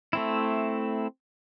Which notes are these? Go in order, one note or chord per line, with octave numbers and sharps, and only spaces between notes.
A3 C4 E4